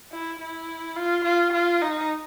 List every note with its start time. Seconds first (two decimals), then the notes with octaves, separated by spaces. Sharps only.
0.12 E4
0.40 E4
0.96 F4
1.25 F4
1.53 F4
1.81 D#4